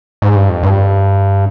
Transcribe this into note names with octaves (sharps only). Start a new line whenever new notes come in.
G#2
G2
F2
G2